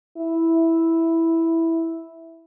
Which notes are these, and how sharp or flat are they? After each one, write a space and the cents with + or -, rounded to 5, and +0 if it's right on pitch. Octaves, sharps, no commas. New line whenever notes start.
E4 -5